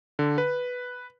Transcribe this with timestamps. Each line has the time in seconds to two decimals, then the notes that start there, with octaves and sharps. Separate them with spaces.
0.19 D3
0.38 B4